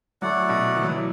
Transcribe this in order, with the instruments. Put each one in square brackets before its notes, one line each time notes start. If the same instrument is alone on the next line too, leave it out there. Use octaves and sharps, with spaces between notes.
[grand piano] F#3 [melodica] A3 E4 D5 F#5
[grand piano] B2
E3
F#3
E3